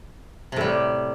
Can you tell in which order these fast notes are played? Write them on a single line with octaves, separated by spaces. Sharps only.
C3 A2 G3